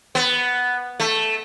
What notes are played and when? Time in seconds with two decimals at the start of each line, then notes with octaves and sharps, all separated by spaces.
0.15 B3
1.00 A3